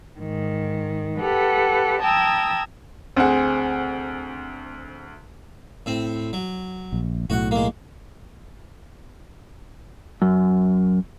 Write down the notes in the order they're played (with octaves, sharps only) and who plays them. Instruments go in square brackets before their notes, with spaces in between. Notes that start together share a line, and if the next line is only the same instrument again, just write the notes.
[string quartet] G#2 D#3
G4 A4 B4 F#5
G5 A5 A#5 D#6 E6 G#6
[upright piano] D2 F#5 [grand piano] C4 G#4
[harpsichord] A2 C4
F#3
[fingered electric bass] A#1
[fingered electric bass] B1 A2 [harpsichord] F#4 F#5
[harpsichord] G#3 A#3
[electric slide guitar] F#2